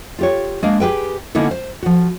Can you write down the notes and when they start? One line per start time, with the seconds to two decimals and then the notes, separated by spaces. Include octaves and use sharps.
0.19 F4 G4 C#5
0.63 G#3 A#3 D4 F5
0.80 G4 G#4 B4 G5
1.35 D3 A#3 B3 C#4 D#4 E4
1.51 C5
1.83 F3 F#4